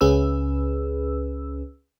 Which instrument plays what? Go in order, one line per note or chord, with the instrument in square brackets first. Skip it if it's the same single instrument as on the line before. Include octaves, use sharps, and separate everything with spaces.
[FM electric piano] C#2 C#4 G#4 B4 E6